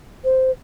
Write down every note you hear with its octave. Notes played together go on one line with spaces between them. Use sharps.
C5